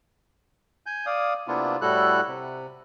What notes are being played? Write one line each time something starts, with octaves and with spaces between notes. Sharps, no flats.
G#5 G6
D5 F5 D#6
C3 A#3 B3 D4 E4 F4
A2 G3 E4 F#4 A4 F#6
C3